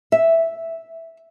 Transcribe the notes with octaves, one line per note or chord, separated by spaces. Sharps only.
E5